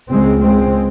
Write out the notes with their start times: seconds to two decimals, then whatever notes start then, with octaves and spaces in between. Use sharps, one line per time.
0.10 C#2 C#3 G#3 C4
0.41 G#3 C4